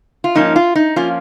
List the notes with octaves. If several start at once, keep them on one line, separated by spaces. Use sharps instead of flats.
F4
G#2 F3 A#3 C#4 D#4
F4
D#4
F3 A#3 C#4 F4